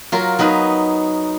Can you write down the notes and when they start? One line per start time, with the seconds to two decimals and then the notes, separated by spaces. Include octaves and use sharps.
0.12 F#3 F4 A#4
0.39 F#3 B3 D#4 B4